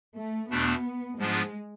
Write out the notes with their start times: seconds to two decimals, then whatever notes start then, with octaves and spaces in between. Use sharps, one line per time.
0.16 A3
0.50 E2 B2 A3 B3 D4
1.19 G#2 F3 G#3 B3 D4 F4